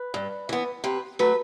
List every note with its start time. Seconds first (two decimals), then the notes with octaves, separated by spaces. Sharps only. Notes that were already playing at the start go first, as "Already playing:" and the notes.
Already playing: B4
0.14 G2
0.49 E3 B3
0.84 C3 B4
1.19 F#3 A3 B4